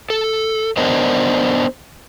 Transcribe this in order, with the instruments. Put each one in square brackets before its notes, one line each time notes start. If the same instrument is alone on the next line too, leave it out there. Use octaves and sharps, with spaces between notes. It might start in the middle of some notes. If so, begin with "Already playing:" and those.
[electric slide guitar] A4
B3 D4 A#4 C5 D#5